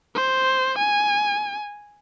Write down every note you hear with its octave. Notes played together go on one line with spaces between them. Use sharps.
C5
G#5